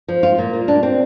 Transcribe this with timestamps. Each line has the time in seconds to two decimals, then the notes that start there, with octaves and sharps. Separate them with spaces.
0.08 F3
0.23 F4
0.38 A#2
0.53 A#3
0.68 D4
0.83 C4